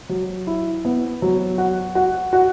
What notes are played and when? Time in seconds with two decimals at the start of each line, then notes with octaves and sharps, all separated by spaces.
0.09 F#3
0.47 E4
0.85 B3
1.22 F#3
1.58 F#4
1.95 F#4
2.33 F#4